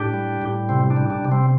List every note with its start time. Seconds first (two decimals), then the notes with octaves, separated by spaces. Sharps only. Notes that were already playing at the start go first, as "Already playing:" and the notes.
Already playing: A2 D4 G4
0.14 G3
0.42 A2
0.69 C3 C4
0.90 D4
0.96 G3
1.10 D4
1.25 C3
1.32 C4